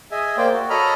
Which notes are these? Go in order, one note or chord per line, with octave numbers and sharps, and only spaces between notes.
G#4 D#5 E5 G#5
A#3 C5 D5 G5
F#4
A4 C#5 D#5 A#5 B5 F6